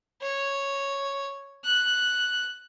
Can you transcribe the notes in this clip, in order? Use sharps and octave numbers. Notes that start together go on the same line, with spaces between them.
C#5
F#6